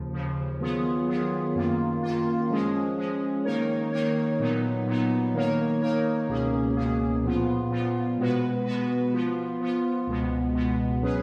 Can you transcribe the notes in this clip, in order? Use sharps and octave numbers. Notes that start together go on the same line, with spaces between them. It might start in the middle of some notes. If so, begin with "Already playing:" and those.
Already playing: D#2 C#3 F3
D#2 C#3 F3
D#3 F#3 B3 F4 G#4
D#3 F#3 B3 F4 G#4
F#2 D#3 A#3 F4
F#2 D#3 A#3 F4
F3 G#3 C#4 G#4
F3 G#3 C#4 G#4
D#3 A#3 D#4 A#4 C#5
D#3 A#3 D#4 A#4 C#5
A#2 F#3 B3 D#4
A#2 F#3 B3 D#4
D#3 A#3 D#4 A#4 C#5
D#3 A#3 D#4 A#4 C#5
C#2 B2 A#3 C#4 G#4
C#2 B2 A#3 C#4 G#4
A#2 F3 B3 F4
A#2 F3 B3 F4
B2 G#3 B3 F#4 B4
B2 G#3 B3 F#4 B4
F3 B3 F4
F3 B3 F4
C#2 B2 G#3 B3
C#2 B2 G#3 B3
F#3 C#4 G#4 B4